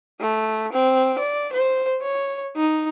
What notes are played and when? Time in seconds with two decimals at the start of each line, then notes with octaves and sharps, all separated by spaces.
0.20 A3
0.73 C4
1.19 D5
1.53 C5
2.02 C#5
2.57 D#4